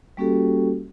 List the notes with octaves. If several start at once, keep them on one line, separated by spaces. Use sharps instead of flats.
G3 A#3 C#4 F#4 G4 A4